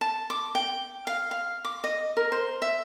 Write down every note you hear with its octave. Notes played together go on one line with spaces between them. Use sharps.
A5
D6
G5
F5
F5
D6
D#5
A#4
C5
E5